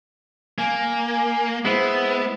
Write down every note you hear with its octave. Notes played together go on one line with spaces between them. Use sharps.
A#3 G#5
G#3 B3 E4 C5